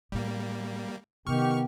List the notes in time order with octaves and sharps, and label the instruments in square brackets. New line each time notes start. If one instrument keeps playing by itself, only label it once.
[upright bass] A2 B3 [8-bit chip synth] G3 A#3
[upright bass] C3 [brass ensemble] D#3 G4 [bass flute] B3 [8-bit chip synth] C#6 F6